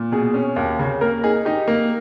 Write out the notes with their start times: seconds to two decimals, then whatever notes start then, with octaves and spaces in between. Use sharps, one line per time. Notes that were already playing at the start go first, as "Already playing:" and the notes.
Already playing: A#2
0.12 B2 G#4
0.34 C#4
0.56 D#2
0.79 C#3
1.01 A#3 A#4
1.23 D#4 G#4
1.45 D#4 G4
1.68 A#3